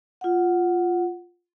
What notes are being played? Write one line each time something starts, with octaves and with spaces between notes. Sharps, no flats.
F4 F#5